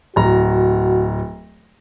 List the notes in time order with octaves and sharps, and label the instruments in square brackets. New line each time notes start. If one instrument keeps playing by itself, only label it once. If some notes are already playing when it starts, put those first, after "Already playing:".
[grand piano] D1 A#5 [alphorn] F#4